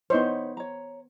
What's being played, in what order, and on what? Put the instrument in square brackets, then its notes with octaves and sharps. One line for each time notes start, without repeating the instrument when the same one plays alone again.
[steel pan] B3 C5 [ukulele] D#4 E4 C#5
[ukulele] C#5 A#5